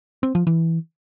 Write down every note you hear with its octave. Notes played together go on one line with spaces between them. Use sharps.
C4
F3
E3